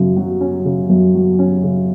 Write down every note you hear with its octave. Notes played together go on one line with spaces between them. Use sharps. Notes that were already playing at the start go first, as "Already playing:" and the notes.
Already playing: F#2 C#3
F#3
C#4
C#3
F#2
F#3
C#4
C#3